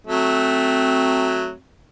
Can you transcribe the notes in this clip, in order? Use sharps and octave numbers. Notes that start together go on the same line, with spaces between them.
F#3 A3 C4